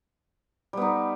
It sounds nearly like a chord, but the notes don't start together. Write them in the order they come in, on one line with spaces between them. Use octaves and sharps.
G3 B3 D#4